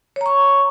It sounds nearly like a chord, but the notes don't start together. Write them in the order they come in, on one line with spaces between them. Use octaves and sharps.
C#5 A#5 C#6